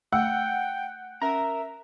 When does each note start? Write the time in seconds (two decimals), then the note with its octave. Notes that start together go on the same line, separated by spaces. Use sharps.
0.13 A3 F#5 G5
1.22 C#4 A#4 E5 A#5